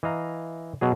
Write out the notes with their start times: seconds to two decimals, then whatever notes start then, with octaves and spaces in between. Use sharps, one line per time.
0.03 E3 D#5 F5 A#5
0.81 B2 F#3 G#4